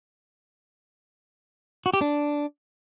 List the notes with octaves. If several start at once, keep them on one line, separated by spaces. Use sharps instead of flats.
F#4
G4
D4